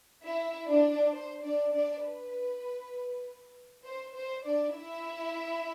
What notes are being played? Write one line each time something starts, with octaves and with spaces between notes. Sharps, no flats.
E4 E5
D4 D5
C5
D4 D5
D4 D5
B4
C5
C5
D4 D5
E4 E5